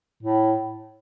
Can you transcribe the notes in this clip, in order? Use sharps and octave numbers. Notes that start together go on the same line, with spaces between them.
A2